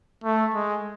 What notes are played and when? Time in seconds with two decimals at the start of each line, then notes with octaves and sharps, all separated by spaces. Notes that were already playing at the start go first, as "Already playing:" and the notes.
0.24 A3
0.54 G#3